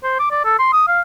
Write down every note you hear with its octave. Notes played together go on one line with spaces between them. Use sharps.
C5
D6
D5
A4
C6
D#6
F5